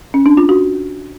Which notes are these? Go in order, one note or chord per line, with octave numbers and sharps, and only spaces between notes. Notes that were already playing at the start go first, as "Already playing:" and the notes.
C#4
D4
F4
F#4